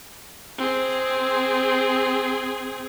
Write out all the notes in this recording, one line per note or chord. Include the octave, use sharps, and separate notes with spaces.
C4 G#4